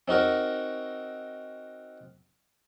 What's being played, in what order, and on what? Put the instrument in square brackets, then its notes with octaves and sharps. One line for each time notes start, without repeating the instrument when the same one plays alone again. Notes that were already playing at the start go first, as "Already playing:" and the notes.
[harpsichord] C4 D#4 F#4 A#4